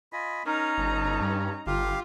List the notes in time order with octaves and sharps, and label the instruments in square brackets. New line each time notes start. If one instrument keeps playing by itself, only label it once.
[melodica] F4 D#5 G#5 [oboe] B5
[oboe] C#4 [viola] D#4 A#5 [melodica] A#4
[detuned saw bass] G1 [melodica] A4
[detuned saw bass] G2
[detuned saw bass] G1 [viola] F4 [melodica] G4 F5